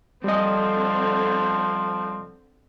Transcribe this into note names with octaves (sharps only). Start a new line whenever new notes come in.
D3 F3 G3 C4 D#5